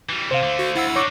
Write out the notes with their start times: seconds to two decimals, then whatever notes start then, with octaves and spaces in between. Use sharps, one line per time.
0.09 E3 G3
0.31 C3 C5 F5
0.43 D3 A3
0.59 F#4
0.75 D2 E4 F#5 E6
0.96 D4 D#4 C#5 C#6 D6